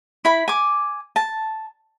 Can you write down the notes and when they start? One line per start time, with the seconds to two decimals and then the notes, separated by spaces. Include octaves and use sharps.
0.25 E4 B5
0.48 G#5 D6
1.16 A5